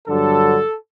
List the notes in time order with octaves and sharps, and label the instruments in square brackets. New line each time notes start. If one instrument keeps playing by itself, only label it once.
[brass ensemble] G2 D3 F#3 A4